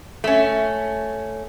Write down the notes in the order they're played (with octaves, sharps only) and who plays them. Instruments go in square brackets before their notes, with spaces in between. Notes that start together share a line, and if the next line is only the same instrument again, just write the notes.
[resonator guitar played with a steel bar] A3 C#4